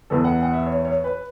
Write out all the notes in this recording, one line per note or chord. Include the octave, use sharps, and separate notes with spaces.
E2 E3 B3 A4
F#5
F#5
E5
C#5
C#5
B4